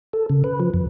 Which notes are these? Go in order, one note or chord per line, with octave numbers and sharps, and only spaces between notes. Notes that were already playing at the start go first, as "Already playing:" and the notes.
A4
C#3
B4
F3
F2